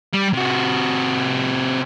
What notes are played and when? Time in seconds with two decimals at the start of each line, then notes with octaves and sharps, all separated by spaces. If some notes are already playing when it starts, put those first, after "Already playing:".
0.14 G3
0.33 C3 F#4